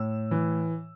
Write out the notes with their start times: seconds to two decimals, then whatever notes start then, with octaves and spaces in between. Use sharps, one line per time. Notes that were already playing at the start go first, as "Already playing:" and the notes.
Already playing: A2 E6
0.31 E3